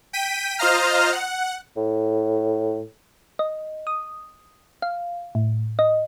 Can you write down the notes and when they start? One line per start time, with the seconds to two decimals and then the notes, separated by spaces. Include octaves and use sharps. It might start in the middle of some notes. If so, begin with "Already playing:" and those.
0.13 G5 B6 D#7
0.59 F4 C5 D#5 F5 A#5 F6
1.13 F#5
1.77 A2
3.39 D#5
3.87 D#6
4.82 F5
5.35 A2
5.79 D#5